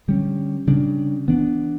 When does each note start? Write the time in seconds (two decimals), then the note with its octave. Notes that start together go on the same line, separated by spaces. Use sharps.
0.08 D3 G3 C#4
0.67 C#3 G3 D4
1.28 E3 B3 D4